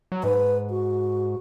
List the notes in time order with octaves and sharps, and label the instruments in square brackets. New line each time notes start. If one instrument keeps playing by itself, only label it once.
[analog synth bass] F#3
[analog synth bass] G#2 [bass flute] B4
[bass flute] F#4